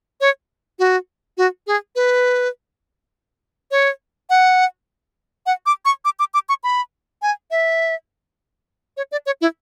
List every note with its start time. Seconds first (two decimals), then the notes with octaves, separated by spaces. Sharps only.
0.21 C#5
0.79 F#4
1.37 F#4
1.67 G#4
1.96 B4
3.71 C#5
4.30 F#5
5.46 F#5
5.66 D6
5.85 C#6
6.05 D6
6.19 D6
6.34 D6
6.49 C#6
6.64 B5
7.22 G#5
7.51 E5
8.97 C#5
9.12 D5
9.26 C#5
9.41 E4